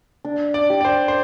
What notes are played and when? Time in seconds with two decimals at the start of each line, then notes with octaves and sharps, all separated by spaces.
0.25 D4
0.54 D5
0.70 G4
0.81 D5
0.85 C5
1.08 C5